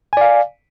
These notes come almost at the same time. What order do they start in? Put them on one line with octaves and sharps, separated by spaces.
G#5 D5 F5